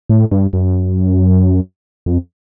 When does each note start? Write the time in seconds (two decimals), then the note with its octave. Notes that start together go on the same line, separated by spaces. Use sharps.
0.10 A2
0.31 G2
0.53 F#2
2.06 F2